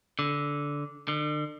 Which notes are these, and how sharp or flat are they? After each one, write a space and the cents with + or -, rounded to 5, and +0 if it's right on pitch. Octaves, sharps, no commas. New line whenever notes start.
D3 -15
D3 +40